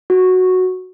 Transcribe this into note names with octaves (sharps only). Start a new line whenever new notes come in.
F#4